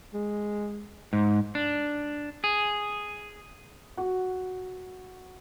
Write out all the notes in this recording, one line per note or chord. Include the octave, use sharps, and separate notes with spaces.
G#3
G#2
D4
G#4
F#4